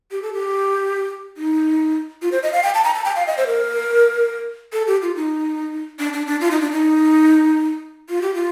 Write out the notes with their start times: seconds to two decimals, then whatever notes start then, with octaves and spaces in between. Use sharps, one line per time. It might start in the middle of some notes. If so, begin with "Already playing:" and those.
0.11 G4
0.22 A4
0.33 G4
1.37 D#4
2.22 F4
2.32 C5
2.43 D#5
2.53 F5
2.63 G5
2.74 A5
2.84 A#5
2.95 A5
3.05 G5
3.16 F5
3.27 D#5
3.37 C5
3.47 A#4
4.73 A4
4.87 G4
5.02 F4
5.16 D#4
5.99 D4
6.13 D4
6.27 D4
6.41 F4
6.51 D#4
6.61 D4
6.71 D#4
8.09 F4
8.22 G4
8.34 F4